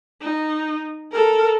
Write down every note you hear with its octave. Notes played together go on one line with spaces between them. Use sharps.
D#4
A4 A#4